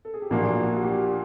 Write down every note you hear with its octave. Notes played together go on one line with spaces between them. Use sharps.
A4
G#4
G4
A#1 A#2 F3 A#3 D4 F#4
F4
F#4
F#4
G4
G4